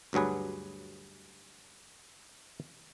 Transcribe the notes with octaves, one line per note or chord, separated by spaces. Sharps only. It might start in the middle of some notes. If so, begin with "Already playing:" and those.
D2 G2 F#3 G#4 B4